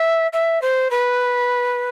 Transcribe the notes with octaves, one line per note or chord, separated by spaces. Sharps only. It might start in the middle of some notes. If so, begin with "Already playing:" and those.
Already playing: E5
E5
C5
B4